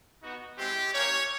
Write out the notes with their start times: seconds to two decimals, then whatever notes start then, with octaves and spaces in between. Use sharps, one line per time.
0.22 B3 D#4 F#4
0.58 G#3 C4 E4 G4
0.93 A#3 C#4 E4 G4 C#5